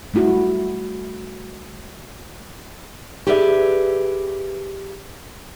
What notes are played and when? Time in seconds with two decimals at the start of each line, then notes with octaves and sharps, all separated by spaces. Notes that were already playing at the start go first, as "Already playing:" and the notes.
0.14 G3 A3 E4 F#4
3.27 G4 G#4 B4 D5 E5